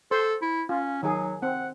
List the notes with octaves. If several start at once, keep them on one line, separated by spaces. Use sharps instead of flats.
A4 C5
E4
C#4 F4
D#3 F#3 G#4
C4 F#5